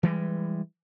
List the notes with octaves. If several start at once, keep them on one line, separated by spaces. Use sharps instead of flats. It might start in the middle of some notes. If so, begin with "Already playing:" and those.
E3 G3 G#3